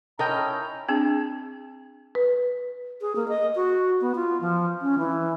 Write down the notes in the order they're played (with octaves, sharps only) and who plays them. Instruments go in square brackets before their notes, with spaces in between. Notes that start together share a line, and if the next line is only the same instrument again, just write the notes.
[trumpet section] C#4 D#4 E4 [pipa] A4 [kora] A#4 D#5 G5 [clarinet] A#5
[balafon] C4 D4 G#4
[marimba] B4
[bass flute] G#4
A#3
D#5
F#4
B3
F4
F3
C#4
E3